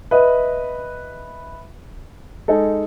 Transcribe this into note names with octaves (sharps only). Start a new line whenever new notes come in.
B4 D#5 E5
G#3 D#4 G#4 A4